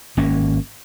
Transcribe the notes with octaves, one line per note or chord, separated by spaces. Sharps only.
G#1 A#3 C#4